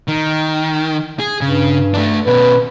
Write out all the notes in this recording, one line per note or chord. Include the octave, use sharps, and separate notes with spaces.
D#3
G#4
G2 C#3
A3 D4
B2 C#4 B4